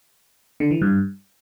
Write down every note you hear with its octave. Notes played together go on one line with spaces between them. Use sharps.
D3
E3
G2